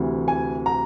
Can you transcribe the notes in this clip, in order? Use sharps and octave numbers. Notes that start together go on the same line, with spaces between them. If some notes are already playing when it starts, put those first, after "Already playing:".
Already playing: D2 C3 E3
G#5
A#5